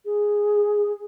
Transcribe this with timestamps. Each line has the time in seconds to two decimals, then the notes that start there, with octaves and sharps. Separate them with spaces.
0.05 G#4